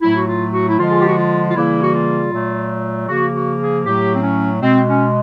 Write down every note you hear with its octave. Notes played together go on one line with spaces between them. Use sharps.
A2 F#3 A3 E4
F#4
F4
F#4
E4
D3 F3 G#3 F4
G#4
G4
F#4
F4
F4
C#3 E3 G3 A#3 E4
F#4
F4
A#2 F#3 A3
C#3 F3 A#3 F#4
F#4
G#4
A2 F#3 A3 G4
C4
C#4
B2 G#3 C4
C#4